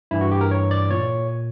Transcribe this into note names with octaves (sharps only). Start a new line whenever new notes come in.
G2 E3 E4
F#4
G4
A#4
C#5
D5
A#2 C#5